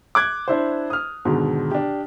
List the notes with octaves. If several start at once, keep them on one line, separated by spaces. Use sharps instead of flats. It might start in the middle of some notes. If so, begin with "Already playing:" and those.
D6 F#6 G#6
D4 E4 C5
D#6 F6
G#2 B2 D3 D#3
D4 G4